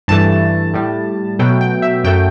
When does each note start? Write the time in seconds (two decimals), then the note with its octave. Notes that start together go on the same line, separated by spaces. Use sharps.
0.08 G2 E3 A3 A5
0.74 A2 G3
1.39 B2 F#3 A3 G5
1.61 G5
1.82 E5
2.04 F#2 F#3 A3 G5